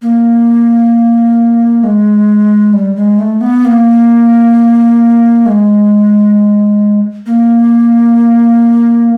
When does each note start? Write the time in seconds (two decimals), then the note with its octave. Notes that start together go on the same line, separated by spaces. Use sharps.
0.02 A#3
1.84 G#3
2.73 G3
2.96 G#3
3.19 A3
3.41 B3
3.65 A#3
5.46 G#3
7.26 A#3